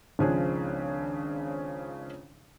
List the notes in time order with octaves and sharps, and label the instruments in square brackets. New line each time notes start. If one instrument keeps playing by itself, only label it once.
[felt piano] G#1 C#2 C#3 F3 D4 G#4